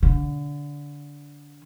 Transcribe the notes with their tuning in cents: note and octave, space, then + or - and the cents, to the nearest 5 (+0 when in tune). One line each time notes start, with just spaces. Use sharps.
D3 -20